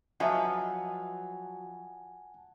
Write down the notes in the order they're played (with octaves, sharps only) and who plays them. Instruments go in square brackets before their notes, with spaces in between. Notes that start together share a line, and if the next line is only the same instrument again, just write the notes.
[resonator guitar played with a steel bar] F3 F#3 B4 [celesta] D#5 E5 [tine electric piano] F#5 G#5 A5